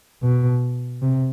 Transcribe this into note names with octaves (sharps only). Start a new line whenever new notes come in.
B2
C3